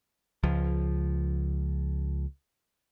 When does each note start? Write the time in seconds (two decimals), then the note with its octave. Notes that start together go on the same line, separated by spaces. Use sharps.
0.43 C#2 F3